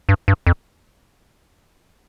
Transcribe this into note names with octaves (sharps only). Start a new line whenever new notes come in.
G2
G2
F2